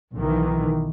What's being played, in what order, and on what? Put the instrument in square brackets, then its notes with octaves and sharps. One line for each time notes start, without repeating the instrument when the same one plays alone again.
[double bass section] B1 D#3 E3